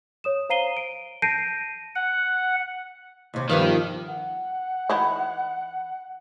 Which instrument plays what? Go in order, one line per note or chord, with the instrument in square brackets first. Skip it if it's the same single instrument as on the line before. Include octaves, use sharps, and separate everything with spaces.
[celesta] C#5 D#6 E7
C5 F5 A#5 C7 D#7 G7
D7
A5 G6 A#6 C7 D7 D#7
[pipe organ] F#5
[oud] D#2 C3
[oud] G2 B3 G4 [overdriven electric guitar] D#3 [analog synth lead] F3
[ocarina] F#5
[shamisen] E3 D#4 E4